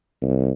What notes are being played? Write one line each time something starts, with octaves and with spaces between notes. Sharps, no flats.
C2